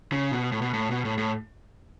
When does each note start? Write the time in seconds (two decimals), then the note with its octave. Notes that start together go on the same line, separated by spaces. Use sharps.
0.12 C#3
0.32 B2
0.52 A2
0.62 B2
0.74 A2
0.91 B2
1.05 A2
1.18 A2